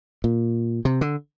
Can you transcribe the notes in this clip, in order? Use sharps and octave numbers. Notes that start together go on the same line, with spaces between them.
A#2
C3
D3